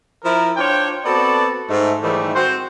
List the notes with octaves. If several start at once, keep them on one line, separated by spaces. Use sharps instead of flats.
F3 E4 A#4
D4 F4 C5 C#5 G5
B3 C4 F#4 A4 D5
G#2 A3
G#2 D#3 E3 G3 A3
C4 F#4 C5